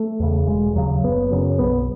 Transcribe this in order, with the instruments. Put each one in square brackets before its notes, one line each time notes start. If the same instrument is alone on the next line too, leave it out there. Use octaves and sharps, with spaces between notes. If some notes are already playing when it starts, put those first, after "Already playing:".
Already playing: [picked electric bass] A3
E2 C#3
E1 G#3
D#2 C#3 F#3
F#1 B3
F#2 C#3
B1 B3